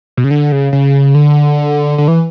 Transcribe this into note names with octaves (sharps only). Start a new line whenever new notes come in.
B2
C#3
D3
C#3
C#3
D3
D3
E3